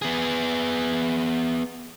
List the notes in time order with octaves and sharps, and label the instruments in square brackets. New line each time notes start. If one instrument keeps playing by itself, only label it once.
[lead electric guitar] B3 G#4